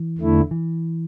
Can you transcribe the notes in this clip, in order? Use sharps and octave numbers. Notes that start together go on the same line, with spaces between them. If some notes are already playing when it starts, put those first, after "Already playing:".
Already playing: E3
E2 D3 A3 E4
E3